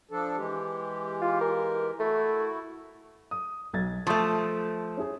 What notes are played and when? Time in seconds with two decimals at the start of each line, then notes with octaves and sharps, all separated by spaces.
0.11 F3 D4 A4
0.37 E3 G#3 G4
1.21 F4
1.41 A#4
2.00 A3 E4 F#4
3.31 D#6
3.73 B1 G#6 A6
4.07 F3 A3 C#6 D#6 G6
4.97 C#4 E4 G#4